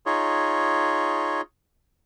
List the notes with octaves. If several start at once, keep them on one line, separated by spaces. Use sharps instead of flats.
D#4 F4 G#4 C#5